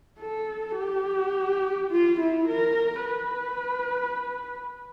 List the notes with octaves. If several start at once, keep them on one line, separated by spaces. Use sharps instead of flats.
A4
G4
F4
E4
A#4
B4